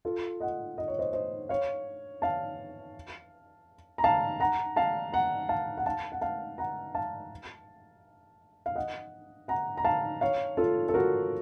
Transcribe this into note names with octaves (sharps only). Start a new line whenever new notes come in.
F4 A4
D#5 F#5
D#5
C#5
C5 D#5
C5 D#5
C#5 F5
F5 A5
A#5
F5 A5
F#5 A#5
F5 A5
F#5 A#5
F5 A5
F#5
F5 A5
F#5
F5 A5
F#5 A#5
F5 A5
F5
D#5 F#5
F#5 A#5
A#5
F5 A5
C#5 F5
F4 A4
A4
F#4 A#4